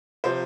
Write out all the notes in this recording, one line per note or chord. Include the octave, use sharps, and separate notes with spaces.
C3 F3 C5